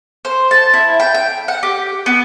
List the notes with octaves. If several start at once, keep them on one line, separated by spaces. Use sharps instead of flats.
C5
A5
E4
G5
G5
F#5
G4
B3